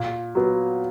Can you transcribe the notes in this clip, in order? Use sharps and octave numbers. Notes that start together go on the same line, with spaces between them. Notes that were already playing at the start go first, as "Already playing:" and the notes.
Already playing: A#2
F#3 B3